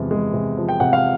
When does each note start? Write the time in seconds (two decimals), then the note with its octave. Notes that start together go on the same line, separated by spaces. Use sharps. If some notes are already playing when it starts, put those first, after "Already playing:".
Already playing: E2 C3 F3 G#3
0.11 G#3
0.33 C3
0.57 F3
0.69 G5
0.80 C3 F#5
0.93 F5